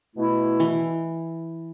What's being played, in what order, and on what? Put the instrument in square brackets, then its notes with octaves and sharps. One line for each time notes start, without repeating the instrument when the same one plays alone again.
[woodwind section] B2 A3 E4
[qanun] E3